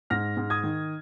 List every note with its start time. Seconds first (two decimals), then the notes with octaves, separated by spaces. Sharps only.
0.10 G#2 F6 A#6
0.37 G#2
0.50 D#6 G#6
0.64 D#3